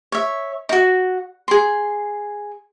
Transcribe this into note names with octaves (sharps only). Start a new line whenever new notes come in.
C#5 E5
D#4 F#4
G#4 C6